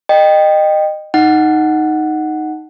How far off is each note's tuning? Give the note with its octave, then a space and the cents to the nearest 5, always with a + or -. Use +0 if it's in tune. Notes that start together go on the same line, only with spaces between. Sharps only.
D#5 -20 G5 +0
D#4 +0 F#5 +0